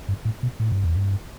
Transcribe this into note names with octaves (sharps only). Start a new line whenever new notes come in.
G2
A2
B2
A2
G2
E2
G2